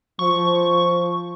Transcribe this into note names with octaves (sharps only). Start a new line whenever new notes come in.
F3 C#6